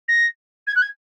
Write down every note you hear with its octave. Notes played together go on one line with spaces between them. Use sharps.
A#6
G#6
F#6
G#6